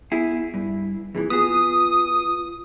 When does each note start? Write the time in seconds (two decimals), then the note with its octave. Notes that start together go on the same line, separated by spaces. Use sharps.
0.12 B3 E4 G#4
0.54 G2 E4
1.15 F2 A#2 E3 G#4
1.30 B3 F4 F#4 G#4 D#6